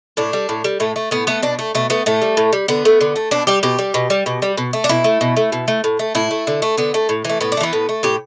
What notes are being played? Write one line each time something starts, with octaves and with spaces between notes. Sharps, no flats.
A2 D4
G3
A2
G3
A2 A3
A3
A2 B3
A3 B3
B2 D4
A3
B2 A3
A3 B3
A2 A3
G3
A2
G3
D3 B3
A3
D3
A3
B2 D4
G3 G4
B2 G4
G3
B2
G3
B2
G3
B2
A3
D4
B2 E4
A3
B2
A3
B2
A3
A2
A3
A2 E4
A3
D3
A3
D3 B3
A3
A2
E3 A3
A2 B3
D4
A3
E3 B3
A2
A3
A2 G4